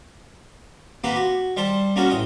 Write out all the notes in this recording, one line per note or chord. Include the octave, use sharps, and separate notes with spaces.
A#3 C4 G4 B4 F#5
F#4
G3 C5 G5 A5
A#3 C#4 F#4 A4 C5
A1 G5 D#6